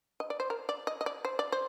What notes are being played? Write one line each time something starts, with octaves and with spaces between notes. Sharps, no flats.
D#5
D5
C5
A#4
D5
D#5
D#5
D5
C5
D5
C5